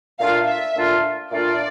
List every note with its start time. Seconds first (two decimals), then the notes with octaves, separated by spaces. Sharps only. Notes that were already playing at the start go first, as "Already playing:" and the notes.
0.19 A#2 A3 D4 F4 F5
0.47 E5
0.76 A#2 A3 D4 F4
1.32 A#2 A3 D4 F4 D5